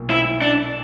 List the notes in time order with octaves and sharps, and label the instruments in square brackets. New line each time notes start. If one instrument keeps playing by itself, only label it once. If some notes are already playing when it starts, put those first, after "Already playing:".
Already playing: [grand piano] B1 A#2 A#3
[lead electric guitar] E4
D4